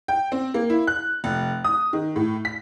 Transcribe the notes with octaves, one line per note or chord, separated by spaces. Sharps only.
G5
C4
A#3
E4
F#6
F1
D#6
D#3
A2
B6